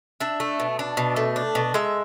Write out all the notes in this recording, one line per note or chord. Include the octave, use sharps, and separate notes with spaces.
D4 E5
A3
B2
D4
B2
A3
D4
B2
G#3 E5